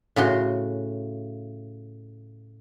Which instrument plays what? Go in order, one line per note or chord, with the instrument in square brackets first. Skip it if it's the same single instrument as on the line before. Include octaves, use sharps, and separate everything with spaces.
[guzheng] A2 C#3 F#4 C6